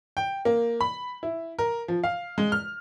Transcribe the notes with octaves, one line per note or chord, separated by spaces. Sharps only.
G5
A#3
B5
E4
A#4
F3
F5
G#3
F6